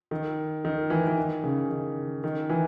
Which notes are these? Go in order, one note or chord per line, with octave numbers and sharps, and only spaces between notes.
D#3
D#3
E3
E3
D#3
C#3
D#3
D#3
E3